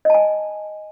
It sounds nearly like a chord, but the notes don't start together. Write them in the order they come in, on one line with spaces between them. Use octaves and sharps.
D#5 A5 G#5